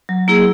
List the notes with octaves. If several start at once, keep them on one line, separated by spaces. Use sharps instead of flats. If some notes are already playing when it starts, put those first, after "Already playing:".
F#3
A#3 E4 G#4